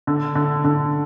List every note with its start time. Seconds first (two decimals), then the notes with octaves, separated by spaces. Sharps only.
0.07 D3
0.35 D3
0.64 D3